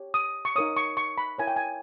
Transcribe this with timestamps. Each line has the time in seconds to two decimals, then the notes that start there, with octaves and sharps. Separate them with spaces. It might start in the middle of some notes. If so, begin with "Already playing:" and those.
Already playing: G4 C#5
0.14 D#6
0.45 C#6
0.56 D#4 A#4 C#5 D#6
0.77 C#6
0.97 C#6
1.18 B5
1.38 E4 A#4 C#5 G#5
1.47 G5
1.56 G#5